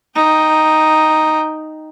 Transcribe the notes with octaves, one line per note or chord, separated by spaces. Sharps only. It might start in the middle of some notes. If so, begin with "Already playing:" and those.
D#4 G5